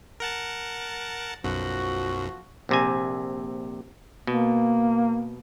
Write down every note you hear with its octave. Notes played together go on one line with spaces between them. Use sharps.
A#4 F#5 A5
B1 F#2 F3 F#4
A#1 C3 G#5
B2 A#3